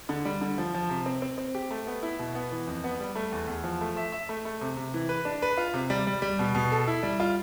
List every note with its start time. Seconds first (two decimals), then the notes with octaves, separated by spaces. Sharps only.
0.09 D3
0.25 G3
0.41 D3
0.58 F3
0.74 F3
0.90 C3
1.06 C4
1.22 C4
1.38 C4
1.55 G4
1.71 A3
1.87 B3
2.03 E4
2.19 B2
2.35 B3
2.52 E3
2.67 F2
2.84 B3
3.00 G3
3.15 A3
3.32 E2
3.48 E2
3.64 F3
3.81 A3
3.97 E5
4.12 E5
4.29 A3
4.45 A3
4.61 C3
4.77 C3
4.94 E3
5.09 B4
5.25 D4
5.42 B4
5.57 F4
5.74 C3
5.90 G3
6.07 G3
6.22 G3
6.39 B2
6.55 B2
6.71 A4
6.88 E4
7.03 G3
7.20 F4